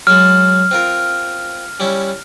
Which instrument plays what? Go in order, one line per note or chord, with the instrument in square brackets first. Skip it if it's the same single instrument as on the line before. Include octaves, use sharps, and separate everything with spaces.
[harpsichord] F#3 G#3 [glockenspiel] F6
[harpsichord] C4 F4 A#4
G3 C#4 E4